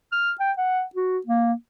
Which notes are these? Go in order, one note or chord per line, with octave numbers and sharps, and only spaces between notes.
F6
G5
F#5
F#4
A#3